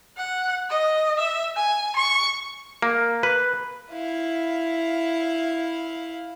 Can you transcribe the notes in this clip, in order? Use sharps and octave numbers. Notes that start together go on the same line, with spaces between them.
F#5
D#5
E5
G#5
C#6
A#3
B4
E4 F5